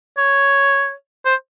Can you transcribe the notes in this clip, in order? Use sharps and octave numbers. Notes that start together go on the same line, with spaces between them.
C#5
C5